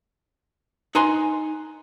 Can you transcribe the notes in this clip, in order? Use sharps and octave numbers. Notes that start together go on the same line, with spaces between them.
D#4 B4 G#5 A#5 C6